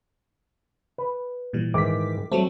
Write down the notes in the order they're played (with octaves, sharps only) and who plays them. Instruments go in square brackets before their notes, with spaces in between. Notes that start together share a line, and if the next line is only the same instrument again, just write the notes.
[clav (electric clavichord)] B4
[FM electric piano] A#2 E3 G3
[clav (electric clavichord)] G#2 D#3 E3 [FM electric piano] D6 B6
[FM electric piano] F#3 G3 C4 [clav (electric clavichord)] A3